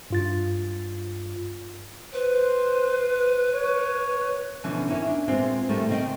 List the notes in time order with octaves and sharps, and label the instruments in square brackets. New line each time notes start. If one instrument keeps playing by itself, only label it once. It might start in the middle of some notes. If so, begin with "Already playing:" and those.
[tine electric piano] G2 F4 A6
[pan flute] B4 [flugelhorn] C5
[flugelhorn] C#5
[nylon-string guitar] B2 D3 E3 F3 C#4
D#3 C#4 E4 C#5
D4
A#2 G#3 B3 C4 F4
A2 D#3 G3 A3 C4
C#3 C4 D#5 E5 F#5 G5